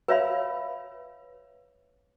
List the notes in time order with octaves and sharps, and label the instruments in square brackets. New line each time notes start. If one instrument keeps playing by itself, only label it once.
[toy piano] B4 C#5 E5 F5 B5